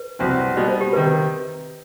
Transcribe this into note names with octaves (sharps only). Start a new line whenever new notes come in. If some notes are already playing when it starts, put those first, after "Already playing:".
Already playing: B4
C2 B2 F#3 C4 F#4
B2 G3 B3 D#4 D#5
C5
G4
C3 D#3 B4